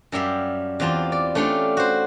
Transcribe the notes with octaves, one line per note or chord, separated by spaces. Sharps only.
F#2 G3 G4 E5 F5
E2 C4 F4 G4 A5
D5
A3 C#4 D4 F4 G4
F#4 C5